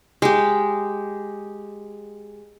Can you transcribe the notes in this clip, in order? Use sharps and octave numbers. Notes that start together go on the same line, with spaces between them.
G#3 G4